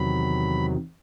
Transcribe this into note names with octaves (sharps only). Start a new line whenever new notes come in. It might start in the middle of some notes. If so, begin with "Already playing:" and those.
Already playing: E2 C3 D#3 F#3 B5